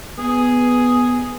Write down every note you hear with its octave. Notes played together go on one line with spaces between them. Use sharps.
B3 G#4